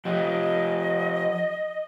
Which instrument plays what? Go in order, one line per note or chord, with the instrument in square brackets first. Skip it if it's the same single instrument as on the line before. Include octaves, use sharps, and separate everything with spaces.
[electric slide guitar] F3 G4 [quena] D#5